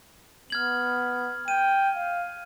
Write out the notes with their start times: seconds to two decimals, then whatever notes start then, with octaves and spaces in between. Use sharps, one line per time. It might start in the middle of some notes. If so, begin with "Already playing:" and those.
0.50 B3 F6 G#6 F#7
1.48 G5 D#7
1.96 F5